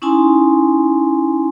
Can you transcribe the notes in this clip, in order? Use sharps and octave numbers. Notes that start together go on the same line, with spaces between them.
C#4 D#4 E4 G#5 A5 C6